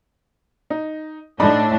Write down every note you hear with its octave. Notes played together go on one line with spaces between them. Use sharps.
D#4
A2 D4 D#4 D5 B5